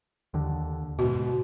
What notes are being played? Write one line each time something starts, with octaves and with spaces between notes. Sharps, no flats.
D#2 D3
G#2 B2 F#4